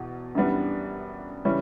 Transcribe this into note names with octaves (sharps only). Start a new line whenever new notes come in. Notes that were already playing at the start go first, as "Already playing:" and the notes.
Already playing: E2 B2
F#2 E3 G3 B3 D4
C#3 E3 G3 C#4